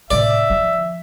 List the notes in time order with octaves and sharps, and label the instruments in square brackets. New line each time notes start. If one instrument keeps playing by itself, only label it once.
[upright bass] A2 C3 [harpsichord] D5 [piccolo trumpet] E5
[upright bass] F3